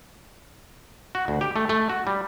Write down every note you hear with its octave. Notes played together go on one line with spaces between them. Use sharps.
F#4
D2
G4
A3
A3
F#4
G3